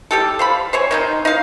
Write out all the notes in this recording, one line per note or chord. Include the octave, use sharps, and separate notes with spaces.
G3 G4 A4
C5 F5 B5
C5 C#5 G#5
D#3 C4 D#4
D#4 F5